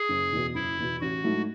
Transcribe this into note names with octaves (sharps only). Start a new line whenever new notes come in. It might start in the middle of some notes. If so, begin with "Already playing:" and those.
Already playing: G#4
F#1
E2 B2
F#1 E4
E2 B2
A1 F#4
G#2 F#3 A3 E4